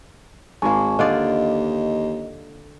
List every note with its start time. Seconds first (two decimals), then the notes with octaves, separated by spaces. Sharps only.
0.62 G#1 G#2 G#3 A#3 G#5 A5 C#6
0.99 D#2 D3 F4 D5 D#5